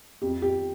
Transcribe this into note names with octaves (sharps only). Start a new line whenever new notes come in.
F2 G4
G4